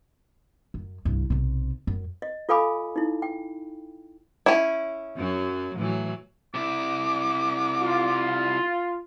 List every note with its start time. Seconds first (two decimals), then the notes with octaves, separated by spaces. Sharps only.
0.74 F#2
1.05 C2 G2
1.30 B1 C3
1.87 F#2
2.22 D#5
2.49 F4 A4 F5 G#5 B5 D6
2.96 D#4 E4
3.22 G5
4.46 C#4 E4
5.16 F#2 F#3
5.77 A2 E3 F#3
6.54 C3 E4 D6
7.82 F4